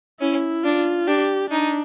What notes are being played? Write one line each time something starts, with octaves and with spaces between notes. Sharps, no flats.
C#4 E4
D4 F4
D4 G4
D4 D#4